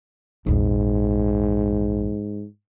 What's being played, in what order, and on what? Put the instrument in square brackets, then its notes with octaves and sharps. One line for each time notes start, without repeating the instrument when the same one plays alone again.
[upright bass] A#1 E2 [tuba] G#2